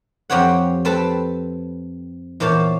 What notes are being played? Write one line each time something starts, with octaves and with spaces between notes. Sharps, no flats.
F2 C4 G4 C#5 F#5
C4 A4 B4 A5
E2 A#2 C5 C#5 A5